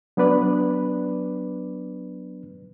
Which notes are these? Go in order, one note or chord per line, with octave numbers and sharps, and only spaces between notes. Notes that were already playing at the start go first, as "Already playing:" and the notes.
F#3 B3 D4 B4 D5